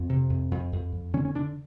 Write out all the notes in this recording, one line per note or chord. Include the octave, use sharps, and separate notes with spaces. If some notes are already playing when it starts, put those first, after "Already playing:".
Already playing: F2 C4
C3
F2
F2
F2
F2
D3 C#4
C#4
D3 D4